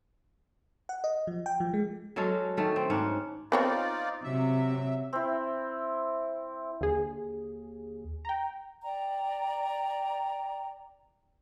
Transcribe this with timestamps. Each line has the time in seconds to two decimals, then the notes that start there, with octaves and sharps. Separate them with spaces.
0.89 F#5
1.04 D#5
1.27 F3
1.46 G5
1.60 F3
1.74 G#3
2.16 F#3 G#3 C#4 A4
2.57 D#3 A3 F#4
2.76 C4
2.90 G#2 C#4 D4 F#5
3.52 B3 C4 D#4 F4 C#5 D5
4.24 C3 F#3 E5
5.13 C4 E4
6.81 D#2 D3 G#4
8.25 G5 A#5
8.83 D5 G5 A#5